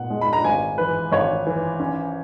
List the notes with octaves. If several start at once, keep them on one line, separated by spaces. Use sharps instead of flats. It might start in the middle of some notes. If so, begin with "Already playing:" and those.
Already playing: A#2 B3 F#5
G#3
B5
A#5
G#1 G#5
E3 B4
G#1 C#5
E3
C#4